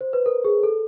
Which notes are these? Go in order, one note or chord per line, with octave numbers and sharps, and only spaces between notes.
C5
B4
A#4
G#4
A4